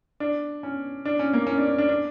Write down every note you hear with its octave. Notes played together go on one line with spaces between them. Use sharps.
D4
C#4
D4
C#4
A#3
C#4
D4
D4
D4
D4